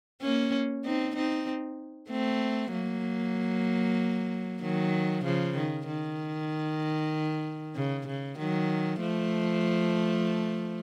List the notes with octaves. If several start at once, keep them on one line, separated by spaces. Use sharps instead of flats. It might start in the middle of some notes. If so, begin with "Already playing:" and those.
A#3 C#4
C4 D#4
C4 D#4
A3 C4
F#3 A#3
D#3 F#3
C#3 F3
D#3
D#3
C#3
C#3
D#3 F#3
F3 A3